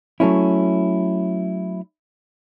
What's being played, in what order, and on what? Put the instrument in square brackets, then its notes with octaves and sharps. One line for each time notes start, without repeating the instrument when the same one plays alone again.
[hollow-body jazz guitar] F#3 A3 C#4 E4